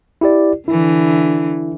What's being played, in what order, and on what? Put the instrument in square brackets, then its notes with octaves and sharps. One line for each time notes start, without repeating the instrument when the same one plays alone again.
[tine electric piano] E4 G4 D5
[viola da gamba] D3 E3 [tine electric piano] E4